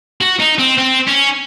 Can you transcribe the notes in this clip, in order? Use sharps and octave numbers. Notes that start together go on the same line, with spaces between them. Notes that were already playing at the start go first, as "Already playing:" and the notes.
F#4
D#4
C4
C4
C#4